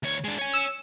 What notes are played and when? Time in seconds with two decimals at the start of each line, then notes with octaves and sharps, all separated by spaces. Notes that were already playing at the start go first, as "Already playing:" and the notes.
0.03 D2 C#5
0.24 G#3 D4
0.39 C#5 G#5
0.54 E6